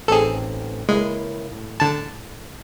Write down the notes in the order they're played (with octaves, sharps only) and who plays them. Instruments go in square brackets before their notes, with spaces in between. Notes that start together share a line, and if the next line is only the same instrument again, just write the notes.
[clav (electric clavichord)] A1 C4 D#4 [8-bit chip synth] G#4 A4
[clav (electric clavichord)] C#2 A#3 E4 [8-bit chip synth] G#3
[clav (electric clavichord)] A2
[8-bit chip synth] D3 A5